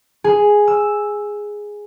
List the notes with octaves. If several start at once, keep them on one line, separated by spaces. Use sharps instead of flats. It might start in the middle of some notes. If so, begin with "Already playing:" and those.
G#4
E6